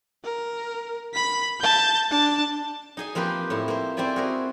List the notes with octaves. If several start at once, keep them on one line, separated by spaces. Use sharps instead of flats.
A#4
B5 B6
A5 G6
D4 A5
D#4 G#4 G#5
F3 A#3 C4 G4 B4
A2 E4
A#3 C5
C4 E4 G4 D5 G#5
F#4 G#4 A#4